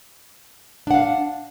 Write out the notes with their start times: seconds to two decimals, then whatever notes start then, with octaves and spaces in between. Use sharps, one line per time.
0.87 D4
0.91 F#5
0.94 F5